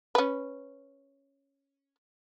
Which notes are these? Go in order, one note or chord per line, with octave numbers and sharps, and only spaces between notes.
C#4 B4